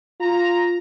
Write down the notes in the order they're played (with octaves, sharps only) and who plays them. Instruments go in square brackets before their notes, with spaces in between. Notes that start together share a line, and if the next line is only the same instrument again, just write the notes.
[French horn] F4 [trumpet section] A#5